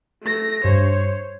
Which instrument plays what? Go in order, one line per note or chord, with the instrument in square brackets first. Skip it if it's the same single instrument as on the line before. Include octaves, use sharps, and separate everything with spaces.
[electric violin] A3 A#6
[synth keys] G2 [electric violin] C5 C#5